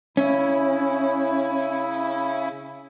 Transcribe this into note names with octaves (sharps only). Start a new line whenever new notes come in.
C#3 C#4 E4